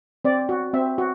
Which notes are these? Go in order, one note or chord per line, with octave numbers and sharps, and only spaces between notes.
C4 D5
F#4
C4 E5
F#4